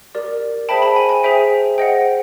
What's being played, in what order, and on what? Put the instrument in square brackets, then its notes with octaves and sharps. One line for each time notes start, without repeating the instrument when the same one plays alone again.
[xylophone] G4 A#4 D5
G#4 C5 E5 G5 A5 B5
A5 B5
G#5
G#5
G#4 C5 E5 G5
G#4 C5 D#5 F#5 G5